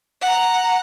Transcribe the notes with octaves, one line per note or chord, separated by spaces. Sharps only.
F#5 A#5